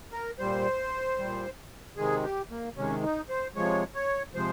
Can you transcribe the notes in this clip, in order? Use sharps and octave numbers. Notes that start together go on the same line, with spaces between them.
A#4
A#2 G3 C5
A#2 G3
C3 D#3 G#3 G#4
G4
A#3
C3 D#3 G#3 C#4
D#4
C5
C3 F3 G#3 C#5
C#5
C3 F3 G#3 C5